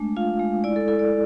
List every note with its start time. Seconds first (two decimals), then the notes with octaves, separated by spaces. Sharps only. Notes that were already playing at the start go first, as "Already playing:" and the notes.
Already playing: G#3 A3 D4
0.16 F4 F5
0.39 G#3
0.64 E4 D5
0.76 A4
0.88 E4 A4
0.99 D5